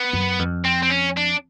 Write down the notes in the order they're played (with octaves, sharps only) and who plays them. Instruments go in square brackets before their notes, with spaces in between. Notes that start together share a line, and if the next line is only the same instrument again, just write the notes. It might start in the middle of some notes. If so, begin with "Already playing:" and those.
Already playing: [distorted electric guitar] B3
[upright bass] F#2
F2
[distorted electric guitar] C4
C4
C#4
D4